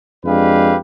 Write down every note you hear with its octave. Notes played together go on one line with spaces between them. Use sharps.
F2 G#3 D4 G4 B4 F5